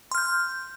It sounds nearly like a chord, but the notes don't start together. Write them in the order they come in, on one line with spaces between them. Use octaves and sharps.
C6 F6 G6